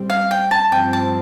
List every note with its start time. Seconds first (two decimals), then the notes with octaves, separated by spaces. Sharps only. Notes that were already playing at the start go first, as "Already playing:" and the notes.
Already playing: A2 G3 C4
0.10 F5
0.31 G5
0.51 A5
0.72 G2 F3 C4 G5
0.93 A5